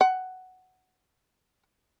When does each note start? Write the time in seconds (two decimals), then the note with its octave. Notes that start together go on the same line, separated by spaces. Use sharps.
0.01 F#5